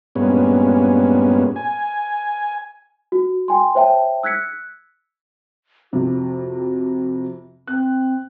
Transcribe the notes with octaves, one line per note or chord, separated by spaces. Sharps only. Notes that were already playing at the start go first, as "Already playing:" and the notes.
G2 A#2 G#3 B3 C#4
G#5
F#4
G5 G#5 C6
C5 C#5 E5 G5 A5
E6 F#6 G#6 B6 C#7
F2 C3 F#4
C4 F#6